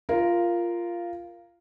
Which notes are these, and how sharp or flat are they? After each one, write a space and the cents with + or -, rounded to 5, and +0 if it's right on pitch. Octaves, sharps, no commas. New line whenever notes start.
F4 -10 A#4 +0